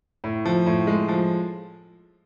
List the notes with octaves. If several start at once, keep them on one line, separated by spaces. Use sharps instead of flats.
A2
F3
A2
G#3
F3